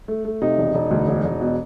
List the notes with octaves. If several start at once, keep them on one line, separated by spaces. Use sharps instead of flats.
A3
A3
C3 D#4
E1
E1
D2
E1
E1
B2